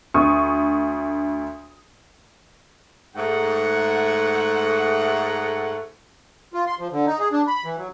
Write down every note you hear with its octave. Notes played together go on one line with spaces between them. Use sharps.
D2 C#6 D#6
G#2 A3 F#5
F4
C6
F3
D3
D#4
G#4
D4
B5
E3
F#3